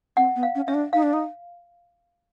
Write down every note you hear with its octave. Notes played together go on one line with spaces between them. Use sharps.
C4 F#5
B3
F5
C#4
C#4 E5
D4
D#4 F5
D4
D#4